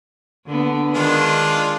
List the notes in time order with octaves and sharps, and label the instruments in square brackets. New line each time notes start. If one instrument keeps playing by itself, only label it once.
[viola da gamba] D3 B3
[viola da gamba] D#3 [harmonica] G#3 D4 F4